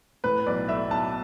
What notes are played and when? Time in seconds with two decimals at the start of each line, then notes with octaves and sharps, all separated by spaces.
0.24 A2 B4
0.46 B1 D5
0.69 A3 E5
0.91 B1 A5